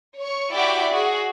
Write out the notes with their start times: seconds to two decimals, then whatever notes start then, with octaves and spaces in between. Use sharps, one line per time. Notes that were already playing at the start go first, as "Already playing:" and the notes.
0.19 C#5 C#6
0.54 E4 F#4 G4 D5 G5 D6
0.91 F#4 G#4